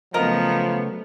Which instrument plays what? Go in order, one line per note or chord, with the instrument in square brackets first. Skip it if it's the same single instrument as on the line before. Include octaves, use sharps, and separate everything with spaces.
[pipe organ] C#3 F#3 A3 [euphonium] F3 [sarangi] B3 [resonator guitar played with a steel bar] A#4 D#5 A#5